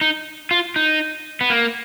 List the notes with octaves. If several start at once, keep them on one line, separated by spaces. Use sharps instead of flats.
D#4
F4
D#4
B3
A#3